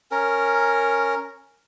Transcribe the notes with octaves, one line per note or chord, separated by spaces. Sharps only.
C#4 A#4